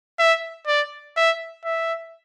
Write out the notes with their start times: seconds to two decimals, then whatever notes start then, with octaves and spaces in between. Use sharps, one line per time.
0.19 E5
0.67 D5
1.17 E5
1.65 E5